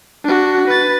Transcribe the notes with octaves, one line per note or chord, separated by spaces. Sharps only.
D4 F#4
B4 A6